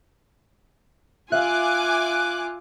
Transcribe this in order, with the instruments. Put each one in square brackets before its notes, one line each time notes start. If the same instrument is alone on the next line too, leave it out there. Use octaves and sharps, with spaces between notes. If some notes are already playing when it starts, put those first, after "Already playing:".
[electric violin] F4 [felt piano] E5 F5 [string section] G#5 D6 [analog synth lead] F#6